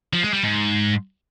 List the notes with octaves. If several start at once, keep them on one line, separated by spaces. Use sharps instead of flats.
F3
G#3
G3
G#2